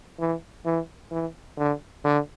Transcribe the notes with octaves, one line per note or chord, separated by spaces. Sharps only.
E3
E3
E3
D3
D3